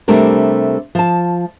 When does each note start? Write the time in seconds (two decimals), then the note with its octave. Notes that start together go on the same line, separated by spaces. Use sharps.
0.08 C3 G3 A3 D4 A#4
0.95 F3 A5